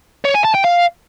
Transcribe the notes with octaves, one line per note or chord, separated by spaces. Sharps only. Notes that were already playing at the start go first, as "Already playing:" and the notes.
C#5
G#5
A5
G5
F5